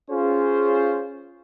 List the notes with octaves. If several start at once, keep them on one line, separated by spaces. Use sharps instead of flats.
C#4 F4 G#4 C5